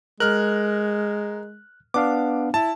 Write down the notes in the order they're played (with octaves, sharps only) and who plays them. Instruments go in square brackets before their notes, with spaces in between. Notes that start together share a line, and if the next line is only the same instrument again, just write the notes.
[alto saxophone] G#3 [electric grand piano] A#4 F6 [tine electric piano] F#6
[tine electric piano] B3 D4 F5 [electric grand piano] D6
[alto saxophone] E4 [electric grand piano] A5